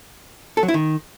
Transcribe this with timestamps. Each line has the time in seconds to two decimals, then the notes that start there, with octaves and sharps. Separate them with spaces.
0.57 A4
0.63 F#3
0.68 E4
0.74 D#3